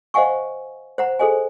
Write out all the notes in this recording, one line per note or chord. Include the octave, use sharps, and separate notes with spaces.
C5 D#5 F5 F#5 G#5 C#6
C5 F#5 A#5
G#4 A4 C5 D#5 G#5